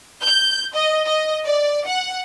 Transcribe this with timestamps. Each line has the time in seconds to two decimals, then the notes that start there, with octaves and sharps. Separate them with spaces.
0.22 G6
0.74 D#5
1.07 D#5
1.46 D5
1.87 F#5